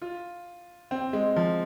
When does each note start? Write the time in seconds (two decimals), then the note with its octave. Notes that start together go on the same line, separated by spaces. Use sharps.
0.02 F4
0.91 C4
1.13 G#3
1.36 F3